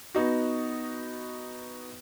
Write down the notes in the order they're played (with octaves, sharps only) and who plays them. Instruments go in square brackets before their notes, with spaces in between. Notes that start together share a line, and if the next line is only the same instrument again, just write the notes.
[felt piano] B3 D#4 F#4